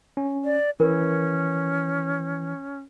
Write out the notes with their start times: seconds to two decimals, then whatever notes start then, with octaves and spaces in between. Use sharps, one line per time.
0.17 C#4
0.45 D5
0.80 E3 C#4 A#4